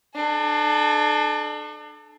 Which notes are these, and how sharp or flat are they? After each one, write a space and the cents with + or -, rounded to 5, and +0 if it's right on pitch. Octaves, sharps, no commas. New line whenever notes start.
D4 +35 A4 -30